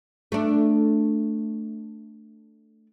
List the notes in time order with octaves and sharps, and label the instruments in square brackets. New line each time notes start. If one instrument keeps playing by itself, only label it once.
[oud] A3 D4